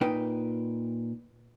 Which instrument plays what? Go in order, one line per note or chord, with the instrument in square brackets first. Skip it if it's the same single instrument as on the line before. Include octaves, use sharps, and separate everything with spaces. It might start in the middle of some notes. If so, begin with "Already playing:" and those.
[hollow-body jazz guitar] A#2 D#4 B4 G5